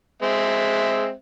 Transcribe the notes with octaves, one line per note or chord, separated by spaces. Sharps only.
G#3 C4 E5